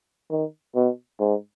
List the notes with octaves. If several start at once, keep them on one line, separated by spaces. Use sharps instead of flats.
D#3
B2
G#2